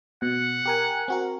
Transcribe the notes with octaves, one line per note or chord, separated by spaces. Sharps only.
B2 F#5
G4 A#4 G#5
C4 F#4 A#4